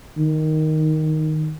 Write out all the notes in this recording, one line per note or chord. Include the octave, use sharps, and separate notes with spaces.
D#3